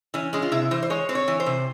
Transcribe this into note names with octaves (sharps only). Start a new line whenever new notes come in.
E3 C#4
G#3 C#4
F4
C3 E4
E3 C5
C5
G#3 C#5
C4 C5
C#5
E3
C5
C3